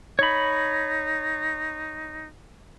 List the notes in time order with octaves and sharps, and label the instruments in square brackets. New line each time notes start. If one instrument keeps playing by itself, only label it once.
[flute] D#4 [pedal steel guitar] C#5 B5